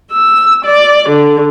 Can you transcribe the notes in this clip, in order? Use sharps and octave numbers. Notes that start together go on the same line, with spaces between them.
E6
D5
D3